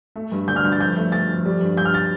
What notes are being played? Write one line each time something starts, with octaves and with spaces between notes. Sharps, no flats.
A3
G2
D3 G6
F6
G2 G6
A6
F2 G6
A3
A3 A6
F2
G3
G2
G2 G6
F6
A6